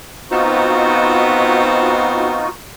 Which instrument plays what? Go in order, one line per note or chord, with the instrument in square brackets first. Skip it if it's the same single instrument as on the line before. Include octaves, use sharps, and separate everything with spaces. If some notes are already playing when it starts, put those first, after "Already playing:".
[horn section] B3 C4 [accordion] D#4 F4 F#4